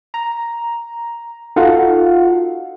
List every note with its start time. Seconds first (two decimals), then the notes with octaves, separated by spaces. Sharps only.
0.14 A#5
1.56 D#4 F4 F#4 A4 F5 F#5